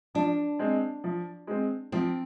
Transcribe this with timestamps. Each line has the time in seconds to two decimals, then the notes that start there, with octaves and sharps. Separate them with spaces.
0.15 F3 D4
0.59 G#3 C4
1.04 F3
1.47 G#3 C4
1.92 F3 C4